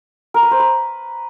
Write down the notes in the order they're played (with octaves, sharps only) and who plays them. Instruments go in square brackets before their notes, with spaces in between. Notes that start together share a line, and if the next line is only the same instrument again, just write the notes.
[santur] A#4
B4
C5
B4